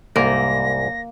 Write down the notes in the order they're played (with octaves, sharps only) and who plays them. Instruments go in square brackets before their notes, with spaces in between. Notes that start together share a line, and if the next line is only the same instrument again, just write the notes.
[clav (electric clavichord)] C2 G#2 [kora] A#3 [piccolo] A#6